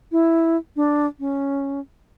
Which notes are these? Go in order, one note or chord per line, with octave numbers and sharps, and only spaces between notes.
E4
D4
C#4